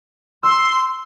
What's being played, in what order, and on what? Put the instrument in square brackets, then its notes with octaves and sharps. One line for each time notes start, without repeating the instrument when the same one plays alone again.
[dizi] C6 [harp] E6